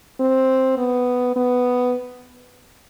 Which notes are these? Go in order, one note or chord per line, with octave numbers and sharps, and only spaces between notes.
C4
B3
B3